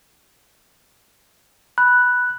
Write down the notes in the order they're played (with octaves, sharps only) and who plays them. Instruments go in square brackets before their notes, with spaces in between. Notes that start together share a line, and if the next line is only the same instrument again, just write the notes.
[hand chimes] B5 [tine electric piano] F#6